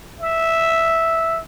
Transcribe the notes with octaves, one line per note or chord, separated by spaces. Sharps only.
E5